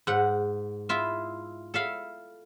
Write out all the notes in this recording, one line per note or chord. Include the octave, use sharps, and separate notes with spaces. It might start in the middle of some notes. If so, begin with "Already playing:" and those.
G#2 F#5
E4 F4 E5
A4 E5 F5 B5